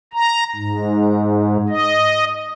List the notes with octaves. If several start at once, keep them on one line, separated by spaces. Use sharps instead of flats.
A#5
G#2
D#5